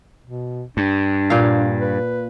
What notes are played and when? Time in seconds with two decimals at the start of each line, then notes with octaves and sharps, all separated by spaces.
0.24 B2
0.77 G2 D4
1.30 A#2 F5
1.81 B4